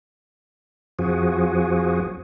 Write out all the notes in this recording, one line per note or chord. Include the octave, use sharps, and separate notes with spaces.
F2 F3 F#4 G#4